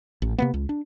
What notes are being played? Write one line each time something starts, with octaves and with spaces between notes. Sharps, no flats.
A1
C3 A#3 B3
C#2
D4